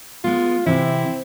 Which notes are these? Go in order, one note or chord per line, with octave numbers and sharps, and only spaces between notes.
G#3 B3 F4
C3 E3 C4 E4